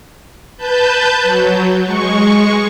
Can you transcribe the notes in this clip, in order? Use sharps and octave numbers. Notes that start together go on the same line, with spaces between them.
B4 A5 G6
F#3
G#3 C#6